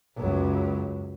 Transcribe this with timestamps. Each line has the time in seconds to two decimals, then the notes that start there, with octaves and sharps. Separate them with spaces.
0.16 C#2 F#2